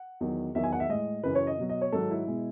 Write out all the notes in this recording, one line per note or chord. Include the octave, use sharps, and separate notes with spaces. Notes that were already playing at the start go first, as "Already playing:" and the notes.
Already playing: F#5
E2 D#3 F#3
E2 D#3 F#3 E5
G#5
F#5
E5
A2 G#3 D#5
F#2 C#3 E3 B4
C#5
D#5
B2 F#3
D#5
C#5
G#2 D#3 F#3 A4
E4
B2 G#3